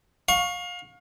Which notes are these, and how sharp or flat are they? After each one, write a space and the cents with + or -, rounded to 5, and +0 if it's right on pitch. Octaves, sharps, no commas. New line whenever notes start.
F5 +30 C#6 +0